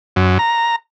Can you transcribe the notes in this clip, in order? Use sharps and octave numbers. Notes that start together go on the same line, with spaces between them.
F#2
A#5